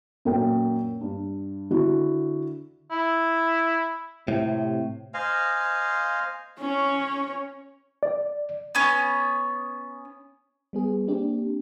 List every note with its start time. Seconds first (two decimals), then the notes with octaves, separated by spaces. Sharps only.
0.25 F#2 A#2 A#3 A#4 G5
1.01 G2
1.70 D3 E4 F#4
2.91 E4
4.28 A2 C3
5.14 C5 D#5 F5 G#5
6.59 C#4 C#5
8.03 D5
8.75 B3 C#4
10.73 G3 B3 G#4
11.07 A#3 C4 D4 G4